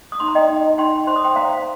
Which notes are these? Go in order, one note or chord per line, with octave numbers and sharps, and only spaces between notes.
D#6
D#4 C6
A#5
D#5 G5
D#4
D#4 G5 C6
C5 C6
D#6
G5 C6
C5 F5 A#5